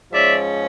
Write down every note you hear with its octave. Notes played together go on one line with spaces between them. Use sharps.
G#2 F3 G#3 C#4 D5 E5